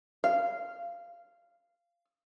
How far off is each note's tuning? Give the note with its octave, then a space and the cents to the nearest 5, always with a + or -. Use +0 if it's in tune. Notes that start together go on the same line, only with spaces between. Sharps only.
F5 -15